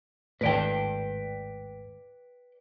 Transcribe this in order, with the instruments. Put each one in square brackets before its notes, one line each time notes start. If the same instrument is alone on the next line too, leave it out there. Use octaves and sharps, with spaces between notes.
[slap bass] G#1 D#2 A2 [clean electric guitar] B4 D5 G5